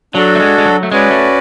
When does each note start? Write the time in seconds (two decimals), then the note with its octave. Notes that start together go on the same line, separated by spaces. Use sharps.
0.14 F#3 D4 F#4 A4
0.35 A3
0.40 G#3
0.58 G#3
0.65 F#3
0.83 A3
0.92 G#3 C#4 F#4 B4 D5
1.11 A3